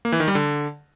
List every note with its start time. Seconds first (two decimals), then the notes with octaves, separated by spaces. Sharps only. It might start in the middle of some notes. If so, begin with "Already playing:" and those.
0.05 A#3
0.12 E3
0.20 D#3
0.28 G3
0.35 D3